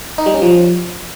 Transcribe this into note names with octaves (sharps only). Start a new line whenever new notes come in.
D#4
G3
C#4
F3